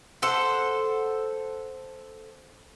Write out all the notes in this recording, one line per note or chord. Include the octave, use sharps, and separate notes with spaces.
A4 C5 F#5